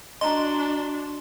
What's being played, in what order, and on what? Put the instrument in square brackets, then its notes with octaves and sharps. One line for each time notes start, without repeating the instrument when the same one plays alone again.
[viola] D4 F#4 [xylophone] D#5 A#5 [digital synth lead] C6